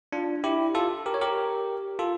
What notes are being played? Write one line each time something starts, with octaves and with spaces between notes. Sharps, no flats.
D4 F4
E4 G4
F4 A4
G4 A#4
C#5
G4 A#4
F4 A4